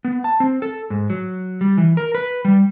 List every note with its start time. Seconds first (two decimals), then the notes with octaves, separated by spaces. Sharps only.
0.05 B3
0.24 A5
0.40 C4
0.62 A4
0.90 G#2
1.10 F#3
1.61 G3
1.77 E3
1.97 A#4
2.15 B4
2.45 G3